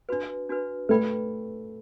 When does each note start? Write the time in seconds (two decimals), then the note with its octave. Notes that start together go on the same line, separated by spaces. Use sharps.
0.09 D4 F#4 B4
0.49 D4 F#4 B4
0.89 A3 B4 D5 G5 B5